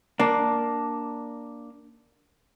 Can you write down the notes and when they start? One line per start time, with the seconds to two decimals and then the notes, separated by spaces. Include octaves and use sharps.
0.19 A#3 D4